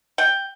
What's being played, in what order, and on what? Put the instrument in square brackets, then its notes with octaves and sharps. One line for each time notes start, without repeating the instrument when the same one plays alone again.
[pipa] G5